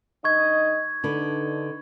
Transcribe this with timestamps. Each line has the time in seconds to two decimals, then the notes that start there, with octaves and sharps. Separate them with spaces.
0.24 D3 D#4 D#5 C#6 G#6
1.04 D3 D4 D#4 B4